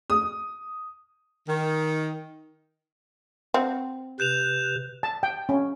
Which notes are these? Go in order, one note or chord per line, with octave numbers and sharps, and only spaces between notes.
D#6
D#3
C4 F#4
C3 B4 G6 E7 F7
A5
G5
C#4